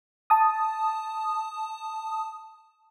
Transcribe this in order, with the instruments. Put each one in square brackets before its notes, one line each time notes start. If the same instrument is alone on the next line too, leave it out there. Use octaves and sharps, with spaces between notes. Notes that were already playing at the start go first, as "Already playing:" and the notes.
[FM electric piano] A5 D#6